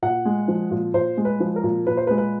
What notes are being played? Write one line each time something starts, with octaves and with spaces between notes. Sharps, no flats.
A#2 F#5
G#3
F3
A#2
A#2 C5
G#3
B4
F3
A#4
A#2
A#2 B4
C5
B4
G#3
B4